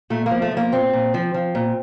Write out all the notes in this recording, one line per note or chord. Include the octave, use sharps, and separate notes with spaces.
A#2 A3
A#3
F3
A3
F3
A#3
A#2 C4
A#2
F3
F3
A#2